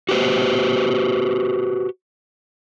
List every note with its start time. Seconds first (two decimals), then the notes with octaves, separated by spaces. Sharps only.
0.09 F#4 G4 B4 C5